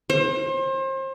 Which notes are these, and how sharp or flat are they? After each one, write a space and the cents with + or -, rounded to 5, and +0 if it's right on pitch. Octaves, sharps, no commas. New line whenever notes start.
C5 +35